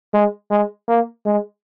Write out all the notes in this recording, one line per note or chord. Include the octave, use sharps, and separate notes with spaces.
G#3
G#3
A#3
G#3